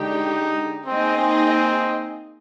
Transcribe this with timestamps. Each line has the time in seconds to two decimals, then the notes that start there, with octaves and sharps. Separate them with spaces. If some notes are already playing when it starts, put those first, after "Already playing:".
Already playing: D3 G#3 D4 D#4 G4
0.86 A#3 C4 D#4 G#4 D#5
1.18 C4